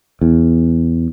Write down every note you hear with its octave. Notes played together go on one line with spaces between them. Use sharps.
E2